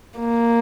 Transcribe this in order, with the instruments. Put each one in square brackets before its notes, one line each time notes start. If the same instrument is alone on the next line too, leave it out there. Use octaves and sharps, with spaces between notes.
[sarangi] A#3